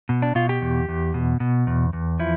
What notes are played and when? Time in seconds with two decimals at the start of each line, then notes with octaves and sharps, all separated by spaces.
0.09 B2
0.22 D4
0.35 B2 F4
0.49 G4
0.62 E2
0.89 E2
1.14 B2
1.40 B2
1.67 E2
1.93 E2
2.20 F3 E4